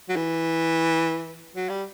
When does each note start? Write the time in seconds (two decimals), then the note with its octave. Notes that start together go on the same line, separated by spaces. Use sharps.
0.09 F#3
0.16 E3
1.55 F#3
1.70 G3